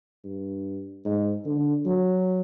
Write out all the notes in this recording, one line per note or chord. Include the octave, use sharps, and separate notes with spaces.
G2
G#2
D3
F#3